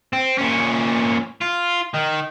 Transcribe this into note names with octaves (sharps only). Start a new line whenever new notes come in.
C4
A#2 C#4
F4
D#3